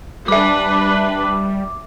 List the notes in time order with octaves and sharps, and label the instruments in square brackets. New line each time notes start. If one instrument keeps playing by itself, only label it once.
[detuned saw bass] G3 [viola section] D4 B4 [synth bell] E5 D6